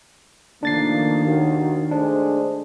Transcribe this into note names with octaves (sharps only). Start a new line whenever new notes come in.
D#3 F3 A3 A#3 D4 A6 C7
D#2 F#4
G#3 A3 D4 C5